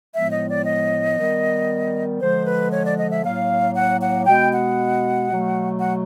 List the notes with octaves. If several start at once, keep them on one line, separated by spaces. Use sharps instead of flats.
A2 F3 G#3 B3 E5
D#5
D5
D#5
D#3 G3 B3
D3 F3 G#3 C5
B4
C#5
D5
D#5
E5
A2 F#3 A#3 F5
F#5
F#5
B2 G#3 B3 G5
F#5
B2 F#3 A3
F#5